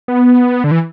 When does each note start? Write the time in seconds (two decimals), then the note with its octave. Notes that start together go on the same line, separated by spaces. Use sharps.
0.08 B3
0.64 D3
0.71 E3